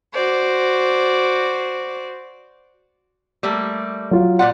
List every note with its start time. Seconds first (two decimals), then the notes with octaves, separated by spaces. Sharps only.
0.12 F#4 C5 D5
3.43 G3 A3 A#3
4.11 F#3 F4
4.39 A#2 D5 F#5 C6